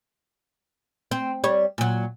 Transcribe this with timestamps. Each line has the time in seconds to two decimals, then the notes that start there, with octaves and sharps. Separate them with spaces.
1.11 C4
1.44 G3 C#5
1.78 A#2 F#3